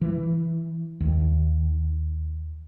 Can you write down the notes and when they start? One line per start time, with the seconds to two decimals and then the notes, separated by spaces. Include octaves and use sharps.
0.01 E3
1.00 D#2